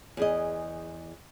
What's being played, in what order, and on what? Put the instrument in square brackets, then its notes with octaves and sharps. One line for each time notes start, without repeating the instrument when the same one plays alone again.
[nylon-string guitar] E2 G#4 D#5